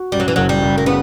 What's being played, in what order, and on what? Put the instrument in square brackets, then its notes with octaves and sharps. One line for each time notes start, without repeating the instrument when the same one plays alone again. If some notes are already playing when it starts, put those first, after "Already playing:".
Already playing: [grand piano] F#4
[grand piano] F#2 [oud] G3
[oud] F#3
E3
[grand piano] F#1 [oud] F#3
[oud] G3
[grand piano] F#1
[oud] A#3
[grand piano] C#3 [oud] B3